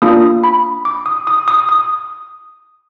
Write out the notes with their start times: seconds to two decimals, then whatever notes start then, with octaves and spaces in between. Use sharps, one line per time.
0.02 A#3 D4 F4 D#6
0.44 B5
0.85 D6
1.06 D#6
1.27 D#6
1.48 D#6
1.69 D#6